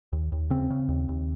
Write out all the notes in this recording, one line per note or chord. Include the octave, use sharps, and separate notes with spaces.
D#2
D#2
C#3 C4
C#3
D#2
D#2